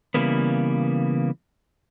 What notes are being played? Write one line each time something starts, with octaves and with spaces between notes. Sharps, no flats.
C#3 E3 G3 A#3 B3